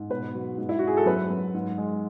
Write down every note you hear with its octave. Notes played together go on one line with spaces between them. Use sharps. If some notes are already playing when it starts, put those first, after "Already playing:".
Already playing: G#2
B2 B4
F#3
G#2
E4
F#4
G#2 G#4
A4
F#2 B4
F#2
G#2
G#3